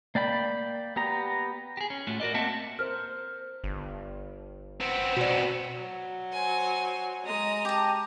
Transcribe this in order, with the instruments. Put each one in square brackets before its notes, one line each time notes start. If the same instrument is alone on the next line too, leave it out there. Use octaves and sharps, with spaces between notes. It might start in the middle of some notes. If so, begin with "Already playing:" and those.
[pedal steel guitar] A#3 D5 G5 B5
B3 G4 A#5
[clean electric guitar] G4 G#4
C#4
A2 A3 F4 F#4
F#4 A#4 D5 D#5
A#3 C4 E5 F#5 A5
[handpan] A#4 C5 [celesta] F6
[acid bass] G1
[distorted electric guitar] B3 C4
[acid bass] B2 [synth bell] F#4 D5
[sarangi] F#3
[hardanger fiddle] C5 G#5
[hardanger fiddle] G#3 D#6 [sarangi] A#5
[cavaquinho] G4 A5